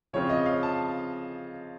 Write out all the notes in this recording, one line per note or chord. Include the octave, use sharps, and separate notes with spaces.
C#3 F3 C4 F4 C#5
D#5
F5
A5